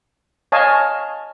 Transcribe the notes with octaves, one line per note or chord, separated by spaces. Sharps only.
C#5 D#5 F5 G#5 A5